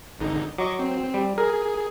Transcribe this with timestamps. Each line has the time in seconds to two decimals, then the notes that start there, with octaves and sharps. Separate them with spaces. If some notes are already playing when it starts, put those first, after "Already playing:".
0.19 G#1 D3 D#4
0.58 F#3 D#5 C#6 D6
0.79 C4
1.14 G3
1.38 G#4 A#4